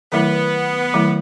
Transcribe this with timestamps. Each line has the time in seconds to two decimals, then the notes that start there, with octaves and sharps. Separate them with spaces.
0.12 D#3 F#3 A3 B3 E4
0.94 D#3 F#3 A3 E4